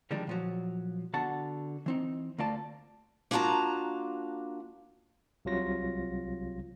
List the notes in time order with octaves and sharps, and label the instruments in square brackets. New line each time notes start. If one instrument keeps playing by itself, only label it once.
[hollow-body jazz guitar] D3 D#3 F3 G3 G#3 D4
A#2 F3 F#3
D3 B3 F#4 F#5 A5
E3 C4 D#4
D2 A3 A#3 F4 D5 A5
[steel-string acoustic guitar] A#3 D4 F4 F#4 A5 A#5
[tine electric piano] C2 C3 F#3 F4 A#6